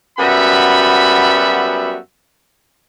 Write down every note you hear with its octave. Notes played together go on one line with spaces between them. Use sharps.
F#2 G3 B3 F#4 E5 B5